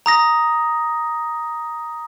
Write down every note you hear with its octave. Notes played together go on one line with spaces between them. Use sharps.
A#5 D#6 A#6